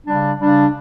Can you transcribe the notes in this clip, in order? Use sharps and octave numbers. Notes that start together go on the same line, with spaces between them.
C#3 G3 D4
C#3 G3 D4